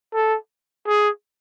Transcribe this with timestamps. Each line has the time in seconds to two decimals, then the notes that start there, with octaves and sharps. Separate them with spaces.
0.14 A4
0.87 G#4